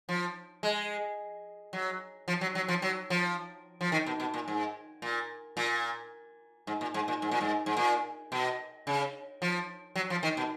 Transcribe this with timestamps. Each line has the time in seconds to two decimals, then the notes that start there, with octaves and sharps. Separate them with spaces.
0.09 F3
0.63 G#3
1.73 F#3
2.28 F3
2.41 F#3
2.55 F#3
2.68 F3
2.82 F#3
3.10 F3
3.81 F3
3.92 D#3
4.07 B2
4.20 B2
4.34 A#2
4.48 G#2
5.02 A#2
5.57 A#2
6.67 G#2
6.81 A#2
6.94 G#2
7.08 A#2
7.22 G#2
7.31 A#2
7.41 G#2
7.66 G#2
7.77 A#2
8.32 B2
8.87 C#3
9.42 F3
9.96 F#3
10.10 F3
10.23 D#3
10.37 B2